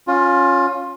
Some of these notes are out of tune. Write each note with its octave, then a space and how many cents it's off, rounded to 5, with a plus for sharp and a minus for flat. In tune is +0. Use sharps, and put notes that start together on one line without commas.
C#4 +0 F4 +20